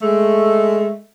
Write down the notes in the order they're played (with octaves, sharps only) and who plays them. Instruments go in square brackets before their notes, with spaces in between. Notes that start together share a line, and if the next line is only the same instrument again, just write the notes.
[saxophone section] G#3 A3